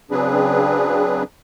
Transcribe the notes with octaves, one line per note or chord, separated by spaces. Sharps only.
C#3 F#3 C4 D4 G#4 B4